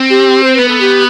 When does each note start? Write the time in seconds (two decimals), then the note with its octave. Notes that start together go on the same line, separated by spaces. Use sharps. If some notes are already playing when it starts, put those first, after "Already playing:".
Already playing: C4
0.09 G4
0.43 C5
0.55 B3 B4
0.68 A4
0.80 G4